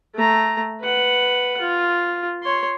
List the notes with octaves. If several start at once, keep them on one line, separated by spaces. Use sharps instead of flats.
A3 A#5
B4 F#5
F4
C#5 C6